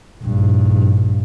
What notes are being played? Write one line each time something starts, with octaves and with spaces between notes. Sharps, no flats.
A#1 G2